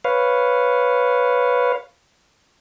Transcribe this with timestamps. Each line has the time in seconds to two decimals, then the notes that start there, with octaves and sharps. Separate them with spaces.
0.05 B4 C#5 F5